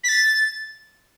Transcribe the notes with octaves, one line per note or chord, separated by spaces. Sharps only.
B6
A6